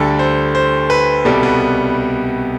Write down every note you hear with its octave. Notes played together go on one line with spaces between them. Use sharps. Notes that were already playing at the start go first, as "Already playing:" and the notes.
Already playing: D2 D3 G3 A4
C5
C5
B4
C2 B2 G3 A4
B3